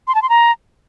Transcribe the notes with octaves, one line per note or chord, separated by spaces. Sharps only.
C6
A5
C6
A#5